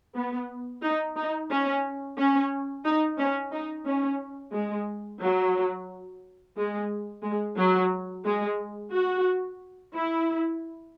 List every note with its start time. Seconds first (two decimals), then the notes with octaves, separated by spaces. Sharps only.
0.15 B3
0.82 D#4
1.16 D#4
1.50 C#4
2.17 C#4
2.85 D#4
3.18 C#4
3.52 D#4
3.86 C#4
4.53 G#3
5.22 F#3
6.56 G#3
7.23 G#3
7.58 F#3
8.24 G#3
8.92 F#4
9.94 E4